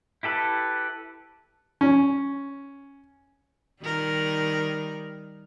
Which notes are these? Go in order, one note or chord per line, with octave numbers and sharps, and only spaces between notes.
E4 G4 A4 B4
C#4
D#3 G3 A#4